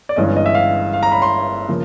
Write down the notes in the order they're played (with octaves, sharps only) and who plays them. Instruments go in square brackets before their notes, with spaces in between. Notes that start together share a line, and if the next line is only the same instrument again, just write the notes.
[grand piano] D5
G1 G2 E3 G#3 C#4 D#5
D#5
E5
F5
F5
A#5
B5
C6
C#3 F3 A#3